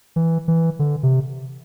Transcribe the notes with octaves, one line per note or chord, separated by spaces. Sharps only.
E3
E3
D3
C3